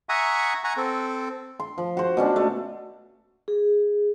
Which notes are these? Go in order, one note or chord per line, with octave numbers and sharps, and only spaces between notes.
E5 F#5 G#5 A#5 C#6 D#6
F#5 G#5 A#5 C#6
C4 A4
C6
F3
F#4 C5
B2 C#4 D4
A3
G#4